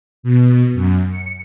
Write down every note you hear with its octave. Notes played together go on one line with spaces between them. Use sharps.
B2
F#2
C#7